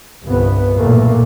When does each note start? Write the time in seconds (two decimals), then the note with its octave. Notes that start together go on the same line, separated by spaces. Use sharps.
0.23 G1 C2 B3
0.77 B1 E2 A#2 A3 A#3